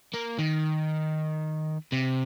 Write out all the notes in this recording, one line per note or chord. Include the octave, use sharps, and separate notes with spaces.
A#3
D#3
C3